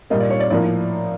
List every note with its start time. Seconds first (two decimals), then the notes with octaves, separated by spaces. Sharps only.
0.10 A#2 G3 A#3 D#5
0.20 D5
0.30 C#5
0.40 D5
0.50 A2 F3 A#3 D5